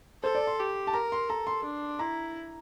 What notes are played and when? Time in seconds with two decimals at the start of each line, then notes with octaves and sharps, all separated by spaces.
0.23 A4 C5
0.35 D5
0.47 C6
0.59 G4
0.87 A5
0.93 A#4 A#5
1.12 C6
1.29 A4 A#5
1.47 C6
1.64 D4
1.99 E4 A#5